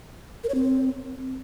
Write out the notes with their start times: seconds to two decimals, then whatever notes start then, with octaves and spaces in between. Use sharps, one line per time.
0.44 A#4
0.49 C#5
0.54 C4